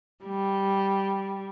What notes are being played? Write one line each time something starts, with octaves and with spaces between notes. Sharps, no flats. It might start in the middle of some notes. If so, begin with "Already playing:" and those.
G3